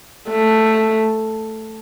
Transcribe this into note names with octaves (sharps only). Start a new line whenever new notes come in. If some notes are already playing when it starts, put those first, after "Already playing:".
A3